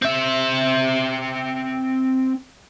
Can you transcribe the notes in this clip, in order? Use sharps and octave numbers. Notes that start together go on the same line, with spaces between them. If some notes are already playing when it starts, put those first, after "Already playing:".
C4 E5